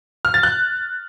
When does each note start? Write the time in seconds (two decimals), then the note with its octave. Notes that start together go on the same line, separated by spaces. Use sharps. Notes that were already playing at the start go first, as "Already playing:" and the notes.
0.25 F6
0.34 A6
0.43 F#6